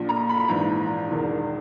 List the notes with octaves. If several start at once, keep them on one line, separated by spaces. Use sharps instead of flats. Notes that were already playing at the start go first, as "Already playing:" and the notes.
Already playing: A#1 A#2
A#5
B5
B5
A#1 G#2 E3 A#5
E1 E2 D#3